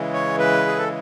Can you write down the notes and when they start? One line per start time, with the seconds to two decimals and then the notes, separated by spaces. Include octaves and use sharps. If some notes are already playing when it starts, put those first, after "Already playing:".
Already playing: C#3 E3 G#3
0.13 C#5
0.39 B4
0.67 G#4
0.78 A4